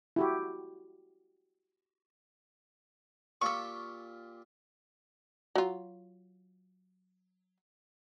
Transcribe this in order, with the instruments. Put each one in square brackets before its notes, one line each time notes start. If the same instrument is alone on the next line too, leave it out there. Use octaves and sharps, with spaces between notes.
[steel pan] E4 F#4 G4
[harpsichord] A#2 F4 G4 [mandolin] C#6 E6
[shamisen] F#3 F4